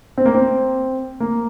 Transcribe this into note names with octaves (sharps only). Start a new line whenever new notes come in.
C4
A#3
C4
A#3